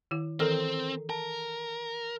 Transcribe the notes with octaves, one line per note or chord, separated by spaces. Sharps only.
D#3 E4
D#3 E3 C4 A4 A#4 A#5 A#6
A#4 A5